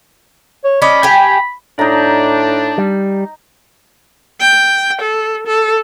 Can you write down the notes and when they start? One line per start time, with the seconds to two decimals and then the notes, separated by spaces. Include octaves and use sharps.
0.64 C#5
0.82 C#4 D5 D#5 B5
1.03 G4 G#5
1.79 A2 D4 D#4 A#5
2.78 G3
4.41 G5
5.01 A4
5.46 A4